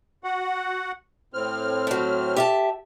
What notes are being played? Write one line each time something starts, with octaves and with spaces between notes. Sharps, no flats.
F#4 F#5
A2 C4 F6
F#3 A3
G4 E5 A5